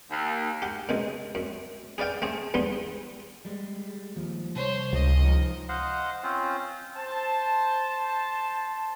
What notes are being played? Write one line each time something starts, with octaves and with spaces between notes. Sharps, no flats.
D#2
G4 F#5
F#2 B2 G#3
F#2
G#4 B4 D5 F5 G5
A3 C4 G#4
E2 G2 B3 C6
G3 G#3
D#2 F3
C2 C5 C#5
C#2 D#5
F3 D#4
C5 D#5 F5 F#5
C4 C#4 F4 C5
C5 A5